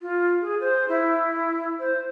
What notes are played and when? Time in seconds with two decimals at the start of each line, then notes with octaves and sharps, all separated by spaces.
0.02 F4
0.41 G#4
0.60 C5
0.89 E4
1.80 C5